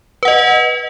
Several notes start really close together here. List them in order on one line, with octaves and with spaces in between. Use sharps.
B4 F#5 D#5